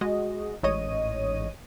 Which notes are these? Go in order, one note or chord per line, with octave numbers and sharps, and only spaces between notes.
G#3 F#4 D#5
A1 G#2 C#5 D#5 D#7